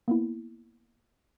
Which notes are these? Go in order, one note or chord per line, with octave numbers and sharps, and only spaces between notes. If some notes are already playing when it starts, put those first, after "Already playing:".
A#3 B3 E4